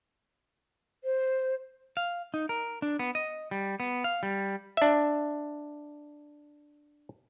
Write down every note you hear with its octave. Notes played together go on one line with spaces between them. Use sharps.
C5
F5
D#4
A#4
D4
B3
D#5
G3
B3
F5
G3
D4 E5